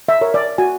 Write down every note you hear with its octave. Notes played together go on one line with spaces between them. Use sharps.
E5
A#4 C#5
D5
F#4 G#5